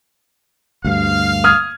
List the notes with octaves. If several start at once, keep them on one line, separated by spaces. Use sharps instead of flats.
D2 G2 F5
D#6 F6 G#6